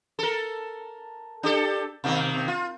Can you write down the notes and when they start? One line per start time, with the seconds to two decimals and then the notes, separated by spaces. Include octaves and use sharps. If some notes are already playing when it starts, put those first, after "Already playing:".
0.19 A4 A#4
1.43 D4 G4 A4
2.04 B2 D#3 A#3
2.48 F4